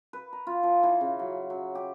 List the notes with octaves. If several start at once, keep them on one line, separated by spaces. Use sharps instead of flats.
B4
A#5
F4
F3
E3
C#3
F#3
F#3
G4